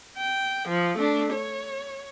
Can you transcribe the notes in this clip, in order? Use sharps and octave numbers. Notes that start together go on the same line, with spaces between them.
G5
F3
A3 D4
C#5